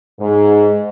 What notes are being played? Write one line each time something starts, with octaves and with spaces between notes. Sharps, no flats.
G#2